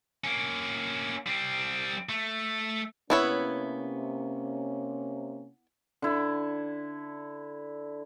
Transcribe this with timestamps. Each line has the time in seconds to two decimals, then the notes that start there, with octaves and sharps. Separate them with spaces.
0.24 A#3 C#4
1.27 G3 C4
2.09 A3
3.10 C3 A#3 B3 C#4 E4 C#5
6.02 D3 E4